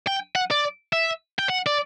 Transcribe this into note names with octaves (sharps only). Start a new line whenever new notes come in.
G5
F#5
D5
E5
G5
F#5
D5